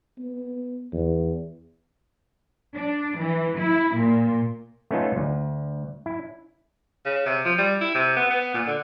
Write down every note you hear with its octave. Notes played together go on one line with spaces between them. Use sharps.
B3
E2
D4
E3
E4
A#2
A3 B3 C#4 D#4 F4 A4
D2
E4
C#3
C3
F3
G3
E4
C3
B3
B3
A#2
D3